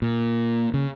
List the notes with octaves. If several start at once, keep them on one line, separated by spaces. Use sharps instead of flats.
A#2
C#3